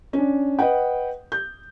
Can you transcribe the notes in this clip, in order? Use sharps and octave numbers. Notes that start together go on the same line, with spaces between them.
C#4 D4
B4 D#5 F#5 G5
G6